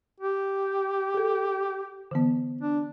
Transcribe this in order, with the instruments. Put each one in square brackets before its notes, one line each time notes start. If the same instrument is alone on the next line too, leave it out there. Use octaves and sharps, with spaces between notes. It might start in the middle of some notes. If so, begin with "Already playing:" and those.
[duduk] G4
[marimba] G#4 A4
D3 E3 B3
[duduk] D4